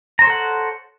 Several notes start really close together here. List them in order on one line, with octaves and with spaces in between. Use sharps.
A#5 C5 C#5 A4 F#5